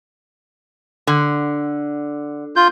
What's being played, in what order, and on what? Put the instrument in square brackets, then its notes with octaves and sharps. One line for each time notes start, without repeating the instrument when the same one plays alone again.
[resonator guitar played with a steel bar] D3
[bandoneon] F4 G6